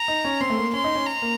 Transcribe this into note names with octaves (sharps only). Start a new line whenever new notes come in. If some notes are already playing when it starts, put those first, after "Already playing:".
Already playing: A#5
D#4
C#4
C4 C6
A3
A#3
C#4 C6
D#4
C#4
A#5
A#3